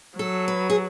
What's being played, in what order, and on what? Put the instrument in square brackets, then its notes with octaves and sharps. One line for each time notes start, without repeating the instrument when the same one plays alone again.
[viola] F#3 [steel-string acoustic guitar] A4
[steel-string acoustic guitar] B4
G#4